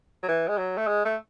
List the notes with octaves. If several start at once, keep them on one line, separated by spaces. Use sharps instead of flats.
F#3
E3
G#3
F#3
A3
G#3
A3